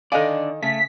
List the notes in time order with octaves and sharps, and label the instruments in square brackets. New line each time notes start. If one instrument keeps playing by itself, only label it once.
[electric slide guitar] D3 D5 [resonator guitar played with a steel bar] D#3 D#5 G#5 [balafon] A4 F5
[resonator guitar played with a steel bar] C#3 [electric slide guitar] A3 [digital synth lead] B6